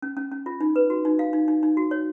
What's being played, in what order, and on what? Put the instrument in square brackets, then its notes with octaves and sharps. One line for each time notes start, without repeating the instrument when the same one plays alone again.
[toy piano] C#4
C#4
C#4
F4
D#4
B4
F#4
D#4
F5
D#4
D#4
D#4
F#4
C#5